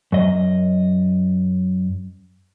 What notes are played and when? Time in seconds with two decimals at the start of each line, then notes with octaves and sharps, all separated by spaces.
0.12 F#2 D#5